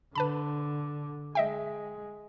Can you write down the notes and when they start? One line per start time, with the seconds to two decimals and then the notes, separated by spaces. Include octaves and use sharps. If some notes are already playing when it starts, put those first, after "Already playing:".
0.15 D3 B4 A5 B5
1.35 G#3 D#5 E5 G5